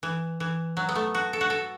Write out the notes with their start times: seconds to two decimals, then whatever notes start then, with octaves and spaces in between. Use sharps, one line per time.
0.03 E3
0.40 E3
0.77 F#3
0.89 B3
0.95 A3
1.15 F#4
1.33 A4
1.41 F#4
1.50 A4